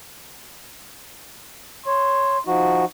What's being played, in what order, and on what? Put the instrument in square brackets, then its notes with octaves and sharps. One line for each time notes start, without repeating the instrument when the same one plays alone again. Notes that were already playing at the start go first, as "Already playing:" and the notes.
[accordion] C#5 [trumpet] C6
[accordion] F3 F#4 [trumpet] D#4